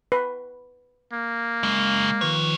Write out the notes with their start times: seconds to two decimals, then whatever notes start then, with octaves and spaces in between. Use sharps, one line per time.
0.12 B4
1.13 A#3
1.63 C#3 F#3 G#3
2.21 D#3 F3 G3 B4 C#5